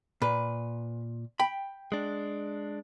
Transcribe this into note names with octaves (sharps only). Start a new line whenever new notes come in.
A#2 B4
G5 B5
G#3 D4